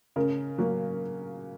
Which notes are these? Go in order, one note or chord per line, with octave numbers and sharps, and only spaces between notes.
C#3 A#4
F#3 A#3